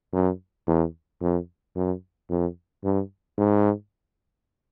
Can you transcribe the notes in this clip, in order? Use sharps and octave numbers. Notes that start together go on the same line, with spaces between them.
F#2
E2
F2
F#2
F2
G2
G#2